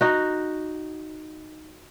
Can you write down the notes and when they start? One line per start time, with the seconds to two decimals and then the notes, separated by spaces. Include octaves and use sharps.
0.01 D#4 F#4